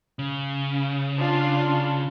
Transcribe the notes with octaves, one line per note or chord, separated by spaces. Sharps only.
C#3
D4 F4